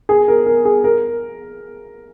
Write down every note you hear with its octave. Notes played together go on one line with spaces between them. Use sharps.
G#4
A#4
A#4
G#4
A#4